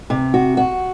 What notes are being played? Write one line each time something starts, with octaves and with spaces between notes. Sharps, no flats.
C3
F#4
F#4